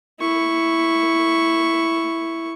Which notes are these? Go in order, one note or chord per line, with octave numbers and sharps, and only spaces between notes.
E4 C#6